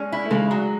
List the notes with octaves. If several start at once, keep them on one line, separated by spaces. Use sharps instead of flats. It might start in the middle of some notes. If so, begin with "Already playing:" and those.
Already playing: G#3 C#4
E4
A3
C#3 G#3
F#3